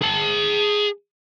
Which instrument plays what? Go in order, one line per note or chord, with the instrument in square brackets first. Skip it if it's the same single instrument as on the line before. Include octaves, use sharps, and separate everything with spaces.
[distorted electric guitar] G#4 A5